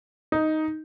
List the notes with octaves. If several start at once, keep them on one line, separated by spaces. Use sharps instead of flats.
D#4